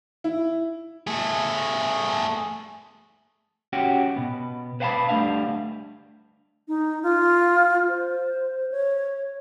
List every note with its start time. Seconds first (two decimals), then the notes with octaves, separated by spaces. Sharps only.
0.24 E4
1.07 A3 G#4
3.73 C#4 F#4 G4
4.16 B2 B3
4.80 B4 C5 F5 F#5 A5 B5
5.09 G3 A3 C4 D4 E5 F5
6.68 D#4
7.03 F4
7.89 C5
8.71 C#5